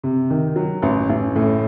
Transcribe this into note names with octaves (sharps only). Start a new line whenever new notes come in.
C3
D#3
F#3
A1
A1
A2